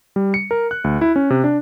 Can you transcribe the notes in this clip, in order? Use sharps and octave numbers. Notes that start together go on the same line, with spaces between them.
G3
C#7
A#4
F#6
D2
E4
C#4
C3
D4